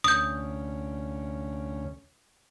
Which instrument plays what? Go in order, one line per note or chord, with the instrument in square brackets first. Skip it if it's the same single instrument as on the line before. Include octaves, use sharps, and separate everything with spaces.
[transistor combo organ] D2 C#4 [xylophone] D#6 G6